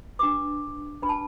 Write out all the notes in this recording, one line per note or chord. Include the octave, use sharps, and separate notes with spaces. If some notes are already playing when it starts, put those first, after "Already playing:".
D4 G4 B4 D6
D4 G4 B4 B5
A5